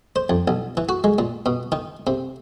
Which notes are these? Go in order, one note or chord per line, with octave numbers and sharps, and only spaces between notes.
C5
F2
B1
E3
F#4
G#3
A#2
B2
D#3
C3